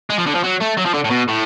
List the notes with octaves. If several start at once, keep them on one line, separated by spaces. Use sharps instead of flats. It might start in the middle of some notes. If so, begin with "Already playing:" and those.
G#3
F3
D3
F3
F#3
A3
F#3
F3
D3
A2
B2
A2